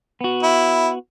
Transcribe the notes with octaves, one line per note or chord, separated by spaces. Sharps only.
B3 F#4
E4